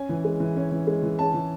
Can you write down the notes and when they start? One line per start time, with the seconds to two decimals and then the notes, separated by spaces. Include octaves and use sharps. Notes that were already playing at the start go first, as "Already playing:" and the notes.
Already playing: C#4 G#5
0.09 E3
0.24 G#3
0.40 E3
0.56 C#4
0.71 E3
0.87 G#3
1.03 E3
1.19 C#4 A5
1.34 E3